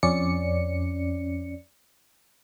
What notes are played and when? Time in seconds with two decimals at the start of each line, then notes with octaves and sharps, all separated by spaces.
0.03 F2 C#4 D5 C#7